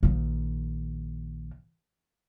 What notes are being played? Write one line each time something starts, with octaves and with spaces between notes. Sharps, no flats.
A#1 D#3